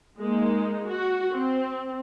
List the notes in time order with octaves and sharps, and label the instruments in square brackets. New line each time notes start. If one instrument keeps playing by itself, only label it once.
[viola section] G#3 A#3 D#4
F#4
C4